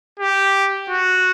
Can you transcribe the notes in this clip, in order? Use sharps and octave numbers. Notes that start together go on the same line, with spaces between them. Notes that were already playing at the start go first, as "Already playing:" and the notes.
G4
F#4